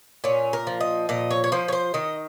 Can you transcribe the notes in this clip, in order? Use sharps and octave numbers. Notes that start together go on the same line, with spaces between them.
A#2 C#4
A#4
F3
D#5
A#2 D#5
C#5
C#5
F3 C5
C#5
C5
D#3 D#5